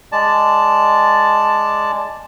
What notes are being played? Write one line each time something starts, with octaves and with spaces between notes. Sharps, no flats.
G#3 D5 A5